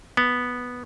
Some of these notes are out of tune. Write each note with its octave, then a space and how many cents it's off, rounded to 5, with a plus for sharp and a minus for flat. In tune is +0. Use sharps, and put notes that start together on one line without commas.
B3 -5